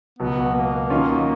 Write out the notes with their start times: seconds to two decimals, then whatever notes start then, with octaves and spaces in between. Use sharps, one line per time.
0.19 C#2 B2 F#3 B3
0.55 A#3
0.90 D#3 F#3 C#4 F4